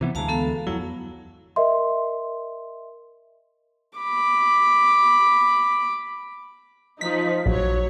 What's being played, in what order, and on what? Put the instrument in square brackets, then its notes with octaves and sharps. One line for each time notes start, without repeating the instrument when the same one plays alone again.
[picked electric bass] C3 E3 B3
[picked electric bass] D2 E3 G#3 [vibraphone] F5 A5 A#5
[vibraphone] B3 A4 F5
[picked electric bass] F2 F#3 [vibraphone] E4
[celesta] A#4 D#5 E5 C6
[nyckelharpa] B5 D6
[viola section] F3 D#4 [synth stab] B6
[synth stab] A#1 [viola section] F#3 C#5